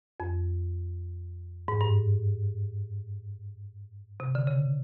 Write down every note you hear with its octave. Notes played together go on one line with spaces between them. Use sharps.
F2
G#2
G2
C3
D3
C#3